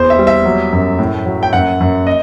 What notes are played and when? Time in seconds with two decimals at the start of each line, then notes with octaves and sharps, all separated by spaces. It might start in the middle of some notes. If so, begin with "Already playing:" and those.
Already playing: E2 C5
0.10 E5
0.18 G3
0.27 E5
0.45 F#3
0.72 F#2
0.99 A2
1.26 F#3
1.43 G5
1.53 F#2 F#5
1.80 F#2
2.07 D#5